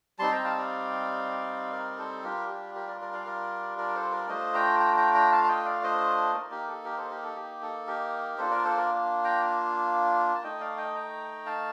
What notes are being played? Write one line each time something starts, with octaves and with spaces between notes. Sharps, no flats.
G3 C4 D#4 A5 C6
G5 A#5
F5 A5
D5 F5
A#4 D5
A4 C5
G3 D4 F4 G4 A#4
G4
G4 A#4
A#4 D5
A#4 D5
D5 F5
A#4 D5
A#4 D5
A4 C5
A#4 D5
A3 D4 F4 C5 D#5
G5 A#5
G5 A#5
G5 A#5
G5 A#5
F5 A5
A5
D#5 G5
D5 F5
C5 D#5
A#3 D#4 A#4 D5
G4 A#4
A4
G4 A#4
A4 C5
G4 A#4
A4
G4
A4
G4 A#4
A#3 D4 F4 A4 C5
A#4 D5
A4 C5
A#4 D5
G5 A#5
A5
A3 D#4 D#5 G5
D5 F5
D#5 G5
G5 A#5
F5 A5